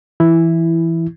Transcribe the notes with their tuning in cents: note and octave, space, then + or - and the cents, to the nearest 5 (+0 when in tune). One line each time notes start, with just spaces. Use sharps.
E3 +10 E4 +0